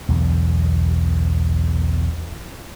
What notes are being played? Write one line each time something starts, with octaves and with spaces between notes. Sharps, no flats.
B1 E2 D3